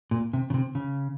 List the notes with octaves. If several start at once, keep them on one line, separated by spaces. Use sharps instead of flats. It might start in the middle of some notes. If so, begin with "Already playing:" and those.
A#2
C3
C#3
C3
C#3